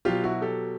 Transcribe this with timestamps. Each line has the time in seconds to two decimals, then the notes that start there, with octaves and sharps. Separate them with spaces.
0.05 B2 F#3 F4 G4
0.24 E4 F#4
0.42 G4 A4